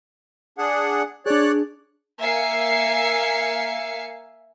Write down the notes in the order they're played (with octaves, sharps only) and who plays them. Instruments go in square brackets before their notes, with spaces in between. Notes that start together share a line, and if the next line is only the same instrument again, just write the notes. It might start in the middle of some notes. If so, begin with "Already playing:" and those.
[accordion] D4 G#4 F#5
[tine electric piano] D4 G#4 [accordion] C#5 D5 F#6
[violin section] A#3 E5 F5 G#5 C7 C#7